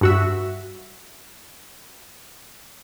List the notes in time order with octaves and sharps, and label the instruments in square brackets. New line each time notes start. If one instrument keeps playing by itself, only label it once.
[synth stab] G2 F#4 E5